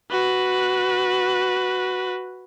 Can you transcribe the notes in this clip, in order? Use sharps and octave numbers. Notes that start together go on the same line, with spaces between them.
F#4 B4